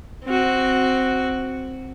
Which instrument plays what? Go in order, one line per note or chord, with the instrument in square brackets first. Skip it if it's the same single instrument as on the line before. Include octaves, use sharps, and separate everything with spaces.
[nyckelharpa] C4 F#4